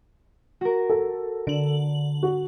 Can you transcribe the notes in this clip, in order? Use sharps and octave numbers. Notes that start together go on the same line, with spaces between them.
F#4 A#4
A4
D3 D7 E7 F#7
F#4